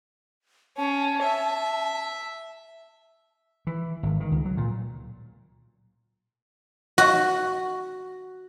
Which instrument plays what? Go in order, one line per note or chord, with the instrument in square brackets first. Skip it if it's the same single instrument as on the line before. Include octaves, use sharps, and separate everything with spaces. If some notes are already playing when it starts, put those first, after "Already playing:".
[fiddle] C#4 [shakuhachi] A5
[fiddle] E5
[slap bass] E3
G#1
D#3
C#2
F#3
A#2
[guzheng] F#4